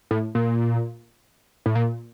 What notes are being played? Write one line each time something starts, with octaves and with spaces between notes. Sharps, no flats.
A2
A#2
A2
A#2